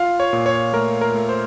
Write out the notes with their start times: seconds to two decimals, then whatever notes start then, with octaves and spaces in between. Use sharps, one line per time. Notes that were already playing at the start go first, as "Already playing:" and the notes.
Already playing: F4 F5
0.20 C#5
0.33 A#2
0.46 C#5
0.73 A3 A#4
1.01 A#4
1.15 A3
1.29 C5